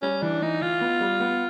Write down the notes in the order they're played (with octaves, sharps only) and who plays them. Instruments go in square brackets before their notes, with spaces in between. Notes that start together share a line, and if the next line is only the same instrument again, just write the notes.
[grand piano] G3 [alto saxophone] C#4
[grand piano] E3 [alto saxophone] D4
[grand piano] E3 [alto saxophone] D#4
[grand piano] E3 [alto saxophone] F4
[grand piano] B3
G3
B3